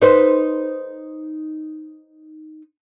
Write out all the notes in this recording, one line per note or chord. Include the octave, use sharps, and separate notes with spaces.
D#4 B4 C5